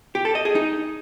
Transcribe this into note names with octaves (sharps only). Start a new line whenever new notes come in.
G4
A4
D#5
G#4
D#4